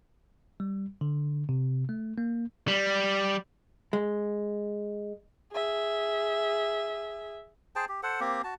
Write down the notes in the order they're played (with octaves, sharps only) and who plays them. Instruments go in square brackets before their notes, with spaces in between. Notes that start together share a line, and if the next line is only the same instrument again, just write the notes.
[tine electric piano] G3
D3
C3
A3
A#3
[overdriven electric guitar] G3
[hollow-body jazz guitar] G#3
[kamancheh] G#4 E5
[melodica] G#4 C5 G5 A5
G4
A4 C5 F#5
A#3 C4 G4
F#4 A5